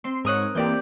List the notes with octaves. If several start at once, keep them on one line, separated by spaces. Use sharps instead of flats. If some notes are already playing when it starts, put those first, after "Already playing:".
C4 C6
G#2 A#4 C#5 D#6 F#6
E3 A#3 C4 G4 D5 G6